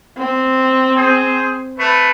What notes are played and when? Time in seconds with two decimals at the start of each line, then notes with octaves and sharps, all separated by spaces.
0.18 C4
0.95 G#4 C5
1.78 A3 B4